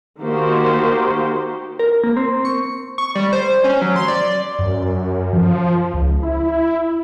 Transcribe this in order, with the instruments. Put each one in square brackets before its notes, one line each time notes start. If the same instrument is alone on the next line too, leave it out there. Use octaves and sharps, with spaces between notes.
[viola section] D#3 A#3 F#4 G4 C5
[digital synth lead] A#4
A#3
C4
C#6
C#6
G3
C5
C#4
F#3
C6
D5
[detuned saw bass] F#2
F3
C#2
E4